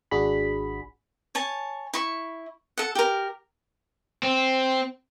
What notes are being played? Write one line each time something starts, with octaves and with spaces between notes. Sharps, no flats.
G#1 D4 F#4 G#4 B5
C#5 G#5 A5
E4 C#6
A4 F#5
G4 A#4
C4